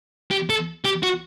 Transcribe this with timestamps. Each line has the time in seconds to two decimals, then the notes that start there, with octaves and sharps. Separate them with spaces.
0.31 G4
0.50 A4
0.85 G4
1.03 F#4